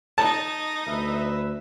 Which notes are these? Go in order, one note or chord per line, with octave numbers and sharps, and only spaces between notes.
D#4 A5
D2 B4 E5